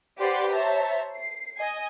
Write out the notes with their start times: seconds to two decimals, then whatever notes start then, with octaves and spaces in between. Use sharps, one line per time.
0.18 G4 B4 C5 D5 F#5 C6
0.52 C5 C#5 E5 A5 A#5
1.17 C7
1.59 D#5 G#5